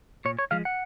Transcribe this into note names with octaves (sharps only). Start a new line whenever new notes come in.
A#2 C#5
C#5
F3 G#3 F5
F#5